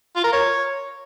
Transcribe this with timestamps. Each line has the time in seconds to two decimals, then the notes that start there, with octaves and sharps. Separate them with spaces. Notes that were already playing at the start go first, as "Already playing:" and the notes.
0.16 F4
0.24 A#4
0.32 C#5